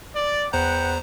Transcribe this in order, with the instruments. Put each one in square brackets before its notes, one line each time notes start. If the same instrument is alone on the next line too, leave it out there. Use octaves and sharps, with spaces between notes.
[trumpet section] D5
[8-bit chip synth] E2 C5 A#5 [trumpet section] B4 F#5 G5